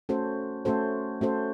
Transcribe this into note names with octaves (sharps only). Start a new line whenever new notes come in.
A3 C#4 F#4 A4 C5
A3 C#4 F#4 A4 C5
A3 C#4 F#4 A4 C5